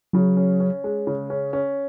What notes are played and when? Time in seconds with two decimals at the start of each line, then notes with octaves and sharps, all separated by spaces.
0.13 C#3 F#3
0.37 C#4
0.60 C#4
0.84 G#3
1.07 C#3
1.30 C#4
1.53 C#4